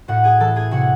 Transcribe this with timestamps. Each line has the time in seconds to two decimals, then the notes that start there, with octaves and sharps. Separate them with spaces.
0.08 A2 F#4 F#5
0.24 G#4 G#5
0.40 E3 A4 A5
0.56 G#4 G#5
0.71 C3 F#4 F#5